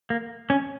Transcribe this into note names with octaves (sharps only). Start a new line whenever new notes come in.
A#3
C#4